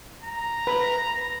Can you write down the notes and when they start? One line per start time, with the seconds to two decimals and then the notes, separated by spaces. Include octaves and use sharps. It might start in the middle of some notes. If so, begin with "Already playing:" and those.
0.23 A#5
0.67 B4 B5